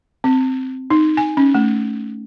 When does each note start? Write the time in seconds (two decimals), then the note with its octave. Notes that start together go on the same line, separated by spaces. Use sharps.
0.24 C4
0.90 D#4
1.17 G#5
1.37 C#4
1.55 A3